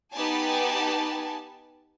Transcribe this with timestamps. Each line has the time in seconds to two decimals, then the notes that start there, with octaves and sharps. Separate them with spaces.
0.13 B3 D#4 G4 B4 G#5 A5